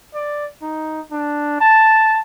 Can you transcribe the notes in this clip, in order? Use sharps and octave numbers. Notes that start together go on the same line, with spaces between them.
D5
D#4
D4
A5